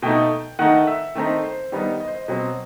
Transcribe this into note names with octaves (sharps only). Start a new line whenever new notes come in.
B2 A3 D#4 G5
D#3 A3 D#4 F#5
E5
D#3 A3 C4 D#4
C5
D#3 G3 B3 D#4
D#5
C5
D#5
B2 F#3 C4